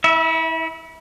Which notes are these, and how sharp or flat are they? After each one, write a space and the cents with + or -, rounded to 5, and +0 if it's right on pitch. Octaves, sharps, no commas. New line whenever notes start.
E4 -30 E5 +0